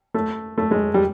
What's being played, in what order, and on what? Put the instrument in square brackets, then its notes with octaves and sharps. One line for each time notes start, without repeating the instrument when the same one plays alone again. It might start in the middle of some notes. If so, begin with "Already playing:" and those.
[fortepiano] A3
A3
G#3
G3